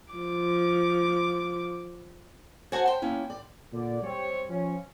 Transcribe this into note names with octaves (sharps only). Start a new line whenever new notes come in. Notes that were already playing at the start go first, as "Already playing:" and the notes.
F3 D6
F#4 C5 F#5 G#5 A5
G5 C6
A#3 C#4 E4
D5
A#2 D3 D5
G3 C4 G4 C#5
F3 C#4